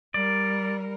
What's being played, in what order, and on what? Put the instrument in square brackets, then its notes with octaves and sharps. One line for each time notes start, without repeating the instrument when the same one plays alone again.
[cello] G3 A#4 [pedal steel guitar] D5